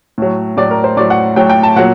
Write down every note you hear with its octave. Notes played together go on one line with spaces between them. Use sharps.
A2 F#3
A2 F#3 D5
A#4
C5
A2 F#3 D5
F#5
A2 F#3 G5
G5
A5
A#2 F#3 F#5